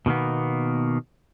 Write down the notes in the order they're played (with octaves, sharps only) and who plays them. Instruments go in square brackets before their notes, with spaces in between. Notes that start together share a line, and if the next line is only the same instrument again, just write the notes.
[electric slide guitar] B2 D#3 A#3 B3